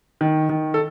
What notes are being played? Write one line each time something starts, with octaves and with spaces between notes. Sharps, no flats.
D#3
D#3
A4